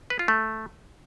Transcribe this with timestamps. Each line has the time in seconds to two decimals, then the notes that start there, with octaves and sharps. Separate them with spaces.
0.10 B4
0.19 F4
0.28 A3